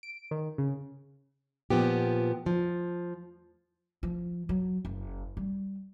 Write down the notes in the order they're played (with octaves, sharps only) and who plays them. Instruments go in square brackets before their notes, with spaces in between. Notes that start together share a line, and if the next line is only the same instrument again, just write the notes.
[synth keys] D7
D#3
C#3
[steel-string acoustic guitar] A#2 F3 B3 G4
F3
[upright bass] F3
F#3
F#1
G3